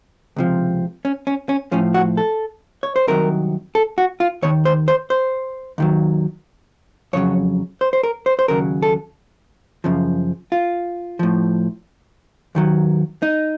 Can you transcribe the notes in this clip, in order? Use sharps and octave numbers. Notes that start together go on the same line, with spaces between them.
C#2 C3 F3
C#4
C#4
C#4
A2 F3 C#4
F#4
A4
C#5
C5
C2 C3 D#3 F#3 A#4
A4
F#4
F4
D#2 D#3 C#5
C5
C5
C5
D#2 D#3 F#3
F2 C#3 F#3 C#5
C5
C5
A#4
C5
C5
D#2 C#3 F#3 A#4
A4
F#2 C#3 F3
F4
A2 F3
D#2 D#3 F#3
D#4